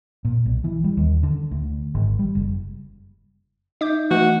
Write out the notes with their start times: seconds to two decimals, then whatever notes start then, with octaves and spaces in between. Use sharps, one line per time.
0.25 A#2
0.45 B1
0.64 E3
0.84 G3
0.97 D#2
1.23 D3
1.51 D2
1.95 G#1
2.19 G3
2.35 F#1
3.81 D#4 E5 D6 G6
4.11 E3 A3 F#4